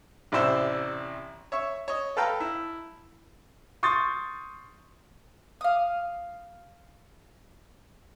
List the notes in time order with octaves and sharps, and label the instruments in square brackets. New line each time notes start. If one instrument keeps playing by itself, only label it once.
[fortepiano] A1 C3 D4 E4 C5 E5
C#5 E5 C#6
C#5 D#5
A4 B4 F5 G5 A#5
E4
[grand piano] C6 C#6 D#6 G6 A6
[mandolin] F5 D#6